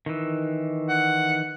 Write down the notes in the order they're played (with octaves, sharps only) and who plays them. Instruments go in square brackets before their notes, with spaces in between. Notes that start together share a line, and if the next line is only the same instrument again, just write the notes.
[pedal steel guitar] D#3 E3
[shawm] F#5